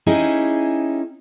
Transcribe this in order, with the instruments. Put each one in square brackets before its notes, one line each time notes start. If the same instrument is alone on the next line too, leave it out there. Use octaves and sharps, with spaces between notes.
[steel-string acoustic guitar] C#4 D#4 E4 G4 G#4